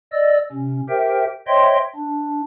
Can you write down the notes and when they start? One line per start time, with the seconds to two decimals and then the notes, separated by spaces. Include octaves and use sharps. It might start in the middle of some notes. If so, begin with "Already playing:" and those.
0.12 D5 D#5 E6
0.52 C3 C#4
0.89 G4 A#4 C5 E5 G5
1.47 C5 C#5 D#5 E5 G5 C6
1.96 D4